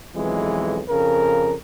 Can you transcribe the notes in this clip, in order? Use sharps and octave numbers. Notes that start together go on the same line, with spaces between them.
B1 F2 E3 G#3
F2 C#3 A#4